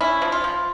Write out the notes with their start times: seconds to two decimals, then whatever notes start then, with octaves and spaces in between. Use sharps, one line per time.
0.01 C#4 E4
0.22 F3
0.32 F4
0.44 F3